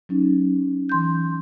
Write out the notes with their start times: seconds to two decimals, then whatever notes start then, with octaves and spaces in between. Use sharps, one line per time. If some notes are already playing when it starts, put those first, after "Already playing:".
0.09 F#3 C#4 D#4
0.89 E3 C6 G6